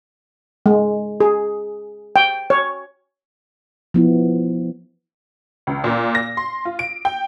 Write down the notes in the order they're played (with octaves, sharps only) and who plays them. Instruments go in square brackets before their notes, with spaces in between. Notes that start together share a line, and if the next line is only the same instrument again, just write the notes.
[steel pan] G#3
G#4
G5
C#5
[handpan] F3 B3 E4
[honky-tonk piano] C#2
A#2
A#6
C6
F4
D7
G5